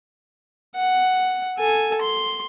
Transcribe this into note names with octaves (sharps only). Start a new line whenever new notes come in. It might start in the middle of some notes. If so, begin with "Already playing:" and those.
F#5
A4 G#5
C6